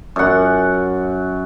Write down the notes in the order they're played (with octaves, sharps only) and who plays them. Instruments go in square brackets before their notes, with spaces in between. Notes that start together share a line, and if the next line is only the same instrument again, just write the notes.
[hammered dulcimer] F#2 F#5